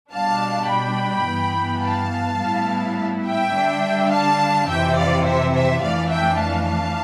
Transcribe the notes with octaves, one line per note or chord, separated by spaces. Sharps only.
B2 G3 D4 F5 A5
G5 B5
G2 E3 B3
F5 A5
A2 G3 B3 E4
E5 G5
D3 G3 D4
F5 A5
F2 C3 E3 E5 G5
D5 F5
C5 E5
C5 E5
F2 E3 A3 D4 D5 F5
E5 G5
F5 A5